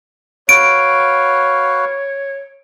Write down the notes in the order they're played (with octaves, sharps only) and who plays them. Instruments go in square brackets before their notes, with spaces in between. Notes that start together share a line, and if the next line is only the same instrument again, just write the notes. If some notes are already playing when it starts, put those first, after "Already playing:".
[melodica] F#4 B4 F5 [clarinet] C#5 [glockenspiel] D7